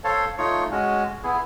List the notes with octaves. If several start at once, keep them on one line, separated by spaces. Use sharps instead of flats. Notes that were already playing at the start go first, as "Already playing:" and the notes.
A4 C5 C#5 F5 A5
A3 D#4 F4 C#5 C#6
G#3 C#4 F#4
B3 E4 G#4